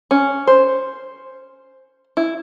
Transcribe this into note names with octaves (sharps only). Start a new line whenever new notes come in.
C#4
C5
E4